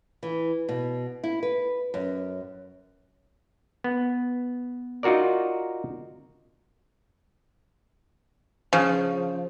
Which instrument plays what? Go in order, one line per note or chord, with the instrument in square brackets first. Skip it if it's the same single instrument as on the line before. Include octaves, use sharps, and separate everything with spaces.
[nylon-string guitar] E3
B2
E4
B4
F#2
[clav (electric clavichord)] B3
D#4 F4 F#4 A#4 D5
[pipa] C#3 [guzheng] F3